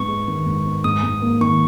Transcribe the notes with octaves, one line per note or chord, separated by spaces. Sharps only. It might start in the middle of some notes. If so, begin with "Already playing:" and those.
Already playing: G#2 B3 C#6
G#3
D#3
G#2
B3
G#2 D#6
G#2
A#3
D#3 C#6